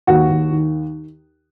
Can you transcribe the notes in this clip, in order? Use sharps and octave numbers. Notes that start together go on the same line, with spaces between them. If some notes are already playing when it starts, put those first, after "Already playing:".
D#2 F#4
D#2
D#3